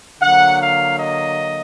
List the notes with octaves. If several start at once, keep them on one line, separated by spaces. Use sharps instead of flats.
D3 F#3 A#3 F#5
F5
D#5